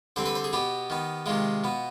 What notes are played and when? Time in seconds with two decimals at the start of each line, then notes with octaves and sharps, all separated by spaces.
0.16 D3 G3 C4 C5
0.26 B4
0.35 C5
0.44 G#4
0.53 B2 B3 G4
0.90 D#3 B3
1.26 C3 D#3 G#3 F4
1.64 B2 B3